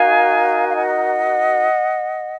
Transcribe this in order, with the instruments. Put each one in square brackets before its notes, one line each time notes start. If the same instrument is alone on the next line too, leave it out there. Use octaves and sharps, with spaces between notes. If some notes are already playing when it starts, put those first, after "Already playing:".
Already playing: [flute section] D#4 F#4 A#4 F5 G#5
F5
D#5 F#5